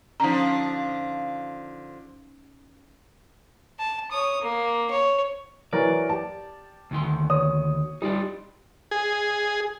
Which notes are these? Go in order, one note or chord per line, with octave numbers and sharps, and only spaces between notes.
D3 F3 C#4 D#4 A#5
A5
C#5 D#6
A#3
C#5
E3 F#3 A#4 D5
G4 A5
D2 D#3 C6
C#5 D#6
G3 D#4 F4 D5
G#4